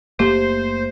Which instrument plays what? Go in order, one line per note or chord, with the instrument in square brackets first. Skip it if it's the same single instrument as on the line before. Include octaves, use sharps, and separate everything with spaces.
[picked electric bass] F#1 A3 A#3 [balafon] G4 [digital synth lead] C5